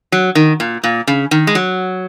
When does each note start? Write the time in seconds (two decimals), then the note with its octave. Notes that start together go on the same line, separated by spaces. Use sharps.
0.12 F#3
0.35 D#3
0.60 A#2
0.84 A#2
1.07 C#3
1.31 D#3
1.47 G#3
1.55 F#3